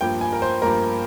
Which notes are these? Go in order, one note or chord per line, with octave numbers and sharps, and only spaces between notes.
G2 F3 A#3 G5
G#5
A#4
C5
G2 F3 A#3 A#4